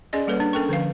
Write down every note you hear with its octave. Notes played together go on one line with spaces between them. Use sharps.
C#4 G#4 D5 D#5 C6
G3 A#3 A4 B4 C#5 F#5
D4
C#4 A4 A#4 G5 C#6
D3 F3 B4 F5